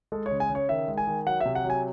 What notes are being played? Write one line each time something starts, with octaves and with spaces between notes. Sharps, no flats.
G#3 A4
C#5
C#3
G#5
C#3
C#5
D#3 E5
G#3
G#5
D#3
F#3 F#5
C3 E5
F#5
F#3
G#5